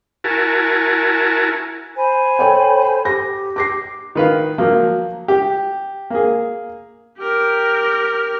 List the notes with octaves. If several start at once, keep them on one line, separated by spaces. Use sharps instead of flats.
E4 F#4 A#4 G#5 A5
C5 G#5 B5
A4 C#5 G5
G4 A#6
D6 A#6 C7
D#3 B4 F5
F3 F#3 A#3
G4
A#3 G#4
G4 A#4